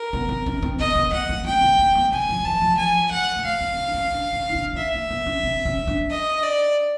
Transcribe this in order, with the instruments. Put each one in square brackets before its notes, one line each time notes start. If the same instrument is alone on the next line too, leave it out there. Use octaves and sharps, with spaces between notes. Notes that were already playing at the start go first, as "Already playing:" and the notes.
Already playing: [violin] A#4
[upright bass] B3
C4
C#4
C4
[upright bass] B3 [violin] D#5
[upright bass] B3
[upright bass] A#3 [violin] F#5
[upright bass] A#3
[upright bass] C4 [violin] G5
[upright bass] B3
A#3
B3
[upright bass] B3 [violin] G#5
[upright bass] F3
F3
[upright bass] E3 [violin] A5
[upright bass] F3
[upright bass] F3 [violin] G#5
[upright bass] F3 [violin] F#5
[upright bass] A3
[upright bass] A#3 [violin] F5
[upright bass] C4
C#4
D4
C#4
D4
C#4
D#4
D4
E4
[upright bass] D#4 [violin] E5
[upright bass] A#3
B3
C#4
C4
C#4
D4
[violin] D#5
D5